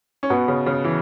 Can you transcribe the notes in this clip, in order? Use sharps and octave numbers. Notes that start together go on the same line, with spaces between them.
C#4
B2 B3
C#3
C#3
E3